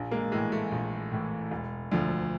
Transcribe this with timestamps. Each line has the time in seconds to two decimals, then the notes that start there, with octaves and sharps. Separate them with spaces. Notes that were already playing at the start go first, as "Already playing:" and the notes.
Already playing: A#1
0.11 G#3 A#3
0.32 A2 E3 G#3
0.52 A3
0.72 A#1
1.12 A2 E3
1.51 E1
1.92 D2 D3 F3